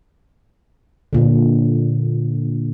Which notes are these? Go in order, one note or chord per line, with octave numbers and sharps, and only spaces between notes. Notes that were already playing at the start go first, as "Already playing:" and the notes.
A#2 D3